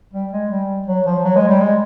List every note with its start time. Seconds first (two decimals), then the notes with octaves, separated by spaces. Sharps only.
0.14 G3
0.33 G#3
0.51 G3
0.88 F#3
1.06 F3
1.24 F#3
1.36 G#3
1.49 G3
1.61 G#3